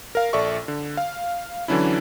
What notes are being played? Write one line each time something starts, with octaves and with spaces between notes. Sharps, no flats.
A#4 F5
A#1 A4 D5 E5 C#6
D3
F5
D3 E3 F#3 C#4 D4 E4